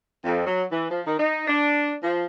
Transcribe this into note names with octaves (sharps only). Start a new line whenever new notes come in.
F2
F#3
E3
F3
D#3
D#4
D4
F3